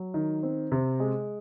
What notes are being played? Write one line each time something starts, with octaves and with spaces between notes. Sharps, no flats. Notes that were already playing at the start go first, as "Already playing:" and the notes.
Already playing: F#3
D#3
C4
C3
G#3